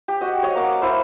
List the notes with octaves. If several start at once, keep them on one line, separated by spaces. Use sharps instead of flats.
G4
F#4 D#5
C#5 D#5 F#5
A#3 D6
E4 C5 F5